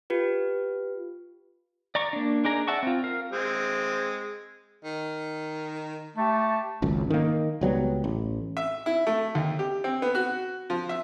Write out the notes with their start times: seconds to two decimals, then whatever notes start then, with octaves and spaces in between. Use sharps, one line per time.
0.10 F4 G4 B4
1.95 D5 A#5 C#6
2.13 A#3 D4
2.45 D4 D#4 G#4 A#4 A#5
2.68 D5 E5 F#5 A5 C#6
2.83 C4 F4
3.04 A#4 F5
3.32 G#3 C4
4.84 D#3
6.17 A3 G4 A5
6.82 G#1 C#2 F#2
7.10 D#3 A#3
7.61 C#2 F#3 G3 B3
8.04 A1
8.57 E5
8.86 E4
9.07 A3
9.35 D#2
9.59 G4
9.84 C4
10.02 B3
10.15 F#4
10.70 F3
10.89 E5